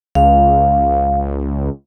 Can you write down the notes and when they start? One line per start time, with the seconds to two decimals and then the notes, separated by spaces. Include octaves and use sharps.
0.15 C#2 F5